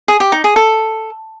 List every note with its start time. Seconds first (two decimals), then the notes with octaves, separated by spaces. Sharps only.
0.08 G#4
0.20 G4
0.32 D#4
0.44 G#4
0.56 A4